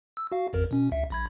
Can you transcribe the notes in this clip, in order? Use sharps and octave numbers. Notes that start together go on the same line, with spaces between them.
E6
F#4 F5
A1 F2 A#4
B2 C#4
C#2 E5
A#1 B5 G#6